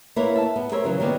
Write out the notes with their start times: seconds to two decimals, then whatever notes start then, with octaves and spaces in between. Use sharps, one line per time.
0.16 A#3 E4 A#4 B4 C#5
0.36 E5 A5
0.56 B3
0.72 A#4 C5 C#5 E5
0.84 C#3 E3 F#3
1.00 D#3 G3 A#3 B3 B4 C#5